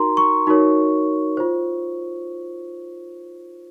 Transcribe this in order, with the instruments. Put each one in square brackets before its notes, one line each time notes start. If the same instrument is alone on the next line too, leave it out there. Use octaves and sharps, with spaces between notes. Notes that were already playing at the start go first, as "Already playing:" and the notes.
Already playing: [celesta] D#4 F#4 A#4 A#5 C6
C#6
D#4 F#4 A#4 C#5
F4 C5